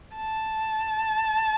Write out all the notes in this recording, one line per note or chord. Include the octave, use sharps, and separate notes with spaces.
A5